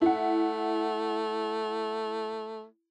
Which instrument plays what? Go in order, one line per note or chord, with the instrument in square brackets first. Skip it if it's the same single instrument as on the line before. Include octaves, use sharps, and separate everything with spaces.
[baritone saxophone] A3 [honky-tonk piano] E4 F#5